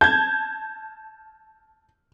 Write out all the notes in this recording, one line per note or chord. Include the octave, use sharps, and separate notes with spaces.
A5 G6 G#6